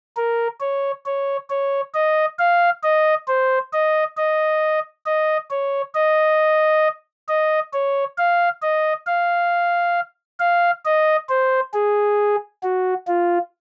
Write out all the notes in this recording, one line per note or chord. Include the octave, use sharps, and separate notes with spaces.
A#4
C#5
C#5
C#5
D#5
F5
D#5
C5
D#5
D#5
D#5
C#5
D#5
D#5
C#5
F5
D#5
F5
F5
D#5
C5
G#4
F#4
F4